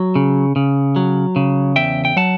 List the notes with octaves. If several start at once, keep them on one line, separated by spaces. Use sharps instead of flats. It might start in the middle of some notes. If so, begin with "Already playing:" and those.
Already playing: F#3
C#3
C#3
F#3
C#3
E2 E5 G5
G5
F#3 F#5 A5